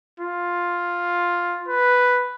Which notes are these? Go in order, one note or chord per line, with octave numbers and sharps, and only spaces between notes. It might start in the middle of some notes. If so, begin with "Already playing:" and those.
F4
B4